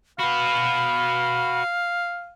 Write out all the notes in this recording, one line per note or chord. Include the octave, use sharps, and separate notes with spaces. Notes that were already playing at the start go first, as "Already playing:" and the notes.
F#4 B4 F5 B5